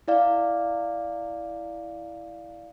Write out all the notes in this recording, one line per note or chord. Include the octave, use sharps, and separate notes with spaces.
E4 D5 F5